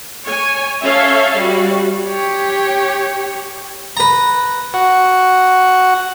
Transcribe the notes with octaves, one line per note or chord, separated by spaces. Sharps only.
C#5 G#5
C#4 A4 C#5 E5 F5
G3 F#4
G4 C#5
B4 A#5
F#4